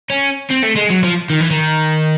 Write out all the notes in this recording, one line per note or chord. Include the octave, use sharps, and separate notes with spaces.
C#4
C4
A3
G#3
F#3
F3
D#3
E3
D#3